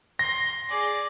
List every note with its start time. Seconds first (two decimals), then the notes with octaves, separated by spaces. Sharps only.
0.19 C6 A#6
0.69 G#4 D5